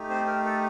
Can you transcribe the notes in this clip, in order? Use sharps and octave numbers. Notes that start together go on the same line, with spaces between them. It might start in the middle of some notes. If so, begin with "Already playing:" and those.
Already playing: A3 D#4 G4
C4 C5
A#4
A4